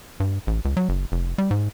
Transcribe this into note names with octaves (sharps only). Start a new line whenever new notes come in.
G2
A1
C#2
F#3
F#1
F1
G3
G#2